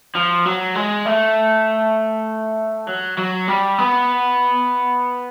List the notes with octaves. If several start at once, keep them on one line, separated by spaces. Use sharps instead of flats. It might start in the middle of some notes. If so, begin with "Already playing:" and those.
F3
F#3
G#3
A3
F#3
F#3
G3
B3